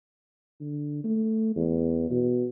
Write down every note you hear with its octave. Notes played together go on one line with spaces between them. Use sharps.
D3
A3
E2
B2